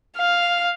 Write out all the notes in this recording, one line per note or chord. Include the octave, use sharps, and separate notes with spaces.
F5